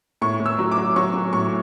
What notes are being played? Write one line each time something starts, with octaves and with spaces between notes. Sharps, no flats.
A2 C#6
A2
E6
F#3
D6
F#3
F#3 C#6
F#3
A2 C#6